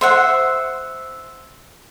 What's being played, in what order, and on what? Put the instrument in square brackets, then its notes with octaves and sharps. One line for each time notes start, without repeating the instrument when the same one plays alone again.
[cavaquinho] C5 E5 F#5